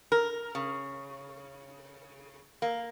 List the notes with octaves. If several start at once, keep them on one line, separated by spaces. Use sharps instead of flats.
A#4
C#3
A#3